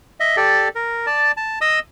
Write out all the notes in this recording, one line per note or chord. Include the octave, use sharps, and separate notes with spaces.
D#5 E5
G4 A4 D5
A#4
D5 A5
A5
D#5 D#6 E6